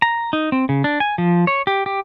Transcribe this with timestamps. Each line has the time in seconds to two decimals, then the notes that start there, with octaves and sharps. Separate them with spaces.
0.02 A#5
0.33 D#4
0.52 C4
0.69 C#3
0.84 D4
1.00 G#5
1.18 F3
1.47 C#5
1.67 G4
1.86 G4